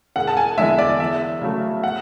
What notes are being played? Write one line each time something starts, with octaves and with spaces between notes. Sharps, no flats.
E1 F#5
A5
G#5
E2 D3 G#3 E5
D5
E2 E5
C#3 F#3 A3
F#5